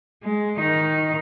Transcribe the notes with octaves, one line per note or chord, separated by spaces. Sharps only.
G#3
D#3 D#4